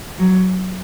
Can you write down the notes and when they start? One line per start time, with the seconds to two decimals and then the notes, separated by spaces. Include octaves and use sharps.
0.19 F#3